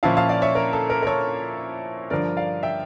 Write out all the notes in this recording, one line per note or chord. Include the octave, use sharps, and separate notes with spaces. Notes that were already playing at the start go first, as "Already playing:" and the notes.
A#2 F3 C#4 E4 F5 A5
F5 A5
D5 F5
C#5 E5
A#4
A4
A#4
A#4
A4 C#5
G2 D3 F3 A#4 D5
D5 F5
E5 G5